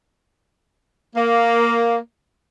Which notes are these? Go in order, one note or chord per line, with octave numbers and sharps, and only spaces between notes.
A#3